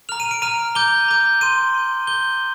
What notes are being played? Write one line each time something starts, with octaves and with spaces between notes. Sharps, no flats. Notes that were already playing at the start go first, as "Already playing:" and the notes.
A#5 F6 F7
D#7
D7
A#5 F6 D#7
A#5 D6 G6 G7
A#5 D6 G6
C6 G6 D#7
C6 G6
A#5 D6 G6 G7